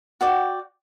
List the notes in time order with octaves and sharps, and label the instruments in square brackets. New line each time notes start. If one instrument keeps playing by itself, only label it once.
[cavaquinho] F#4 D5 G5